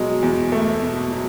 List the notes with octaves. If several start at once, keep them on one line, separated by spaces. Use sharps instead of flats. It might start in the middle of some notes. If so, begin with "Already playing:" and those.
Already playing: B2 F#3 G#3
E2
A3
B2
F#3